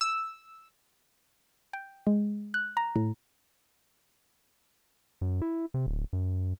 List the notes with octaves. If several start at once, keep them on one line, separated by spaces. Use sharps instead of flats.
E6
G5
G#3
F#6
A#5
A2
F#2
E4
C3
D1
F#2